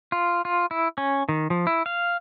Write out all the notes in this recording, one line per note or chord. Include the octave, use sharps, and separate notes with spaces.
F4
F4
E4
C#4
D#3
F3
E4
F5